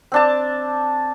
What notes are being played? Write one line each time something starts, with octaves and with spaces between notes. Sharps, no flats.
C4 D4 A5